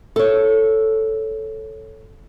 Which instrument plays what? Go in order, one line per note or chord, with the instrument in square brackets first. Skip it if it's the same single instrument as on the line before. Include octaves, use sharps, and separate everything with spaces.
[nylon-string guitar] A4 C#5